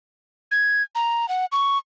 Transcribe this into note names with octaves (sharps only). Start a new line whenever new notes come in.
G#6
A#5
F#5
C#6